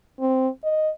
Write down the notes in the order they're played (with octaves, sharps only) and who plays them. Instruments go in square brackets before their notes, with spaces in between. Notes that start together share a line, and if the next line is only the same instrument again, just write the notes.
[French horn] C4
D#5